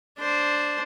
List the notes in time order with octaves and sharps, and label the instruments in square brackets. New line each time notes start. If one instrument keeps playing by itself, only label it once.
[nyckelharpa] D4 C5